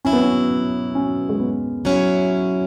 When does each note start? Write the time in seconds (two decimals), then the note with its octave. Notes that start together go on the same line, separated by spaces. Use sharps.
0.05 B2 F#3 C#4 E4
0.13 B3
0.22 C#4
0.95 C#4
1.29 G#3
1.40 B3
1.85 F#3 C#4 E4